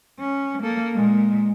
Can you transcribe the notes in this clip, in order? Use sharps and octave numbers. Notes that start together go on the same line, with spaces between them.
C#4
A#3 A4
A#2 G#3